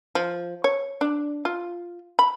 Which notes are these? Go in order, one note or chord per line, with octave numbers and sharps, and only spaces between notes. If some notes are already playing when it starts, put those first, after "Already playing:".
F3
C#5
D4
F4
B5